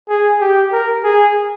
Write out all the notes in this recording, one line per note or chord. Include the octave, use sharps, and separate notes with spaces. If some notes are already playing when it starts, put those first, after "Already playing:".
G#4
G4
A#4
G#4